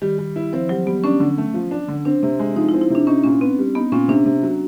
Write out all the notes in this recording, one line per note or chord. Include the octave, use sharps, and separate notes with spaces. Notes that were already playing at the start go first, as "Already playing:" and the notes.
D#3 G3
G3
E4
F3 C4
F#3 G3
G3 B3
C#4 D4
D3
A3
F3
D4
D3
C4 D4
C3
G#3
F3 D#4
E4
C4
E4
C3 D4
C#4 D#4
A#2 C#4
B3 C4
G3
B3 D#4
A#2 C#4
C3 D4
C3
F#3